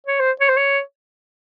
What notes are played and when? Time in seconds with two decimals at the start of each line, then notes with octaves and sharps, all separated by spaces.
0.06 C#5
0.20 C5
0.40 C#5
0.49 C5
0.57 C#5